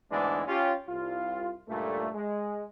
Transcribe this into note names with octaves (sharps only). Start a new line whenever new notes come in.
D2 G#2 E3 G#3 B3 D4
C#4 F4 G4
C2 F4
C#2 G2 A#2 A3
G#3